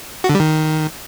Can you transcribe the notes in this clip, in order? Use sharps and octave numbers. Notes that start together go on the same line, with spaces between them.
F#4
D3
G3
D#3